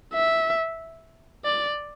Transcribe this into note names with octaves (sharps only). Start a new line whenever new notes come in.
E5
D5